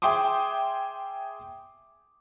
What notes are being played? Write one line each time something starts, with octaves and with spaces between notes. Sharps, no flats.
G#4 E5 G5 C6 D6 D#6